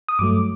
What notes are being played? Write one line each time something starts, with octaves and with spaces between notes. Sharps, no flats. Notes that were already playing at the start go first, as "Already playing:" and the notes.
D#6
G2 F#3 A3 D6